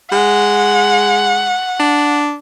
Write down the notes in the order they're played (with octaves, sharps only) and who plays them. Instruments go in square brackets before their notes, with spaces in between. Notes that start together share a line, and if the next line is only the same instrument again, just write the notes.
[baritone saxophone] G#3 [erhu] F#5
[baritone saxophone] D4